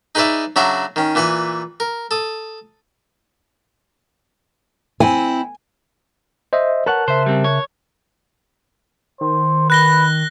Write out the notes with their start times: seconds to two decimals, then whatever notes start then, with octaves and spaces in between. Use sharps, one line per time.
0.15 D#4 G#4 B4 C#5 D5 E5
0.56 C#3 F#3 D4 F#4 E5 A#5
0.96 D#3 C#4
1.15 A#2 E3 B4 G#5 C#6
1.80 A#4
2.11 A4 D#6
5.00 C4 E4 G#5
6.53 C5 D#5 E5
6.86 A#4 B4 C#5 F#5 A5 F#6
7.08 C#3 C5 E5
7.26 G3 C4
7.44 C#5
9.21 D#3 C5
9.70 B4 F#6 A#6 G7